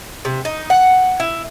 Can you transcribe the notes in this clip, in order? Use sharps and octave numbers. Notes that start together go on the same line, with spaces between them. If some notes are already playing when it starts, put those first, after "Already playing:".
C3
D#4
F#5
E4